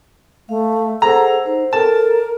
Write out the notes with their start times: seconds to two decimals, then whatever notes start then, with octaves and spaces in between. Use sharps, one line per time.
0.49 A3 F5
1.02 G#4 A4 C5 F#5 A#5
1.46 D#4 C5
1.73 A4 A#4 A5